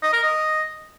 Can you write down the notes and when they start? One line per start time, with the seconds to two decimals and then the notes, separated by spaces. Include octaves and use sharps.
0.02 D#5
0.13 A#4
0.23 D#5